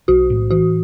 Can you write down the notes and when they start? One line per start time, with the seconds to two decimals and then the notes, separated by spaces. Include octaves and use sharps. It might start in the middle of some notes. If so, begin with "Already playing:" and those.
0.08 B1 F#4
0.30 A2
0.51 E3 F#4